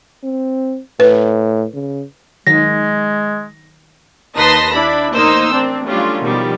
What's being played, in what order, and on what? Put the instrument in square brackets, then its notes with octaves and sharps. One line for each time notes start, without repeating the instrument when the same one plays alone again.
[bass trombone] C4
[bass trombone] A2 [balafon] B4
[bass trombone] C#3
[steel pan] D#3 F#3 [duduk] G#3 [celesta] A#6
[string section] D#2 D#4 B4 A5 C6 A#6
D4 E4 B5
A1 A#3 D#4 A#4 C5 E6
C4 D4
F#3 G3 A3 C#4 D4 F4
B2 D#3 F3 G3